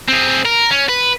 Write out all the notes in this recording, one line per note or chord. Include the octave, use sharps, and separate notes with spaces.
C4 G#4
A#4
C#4
B4